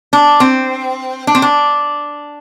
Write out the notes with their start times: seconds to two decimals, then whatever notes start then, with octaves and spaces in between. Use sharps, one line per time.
0.13 D4
0.40 C4
1.27 D4
1.35 C4
1.42 D4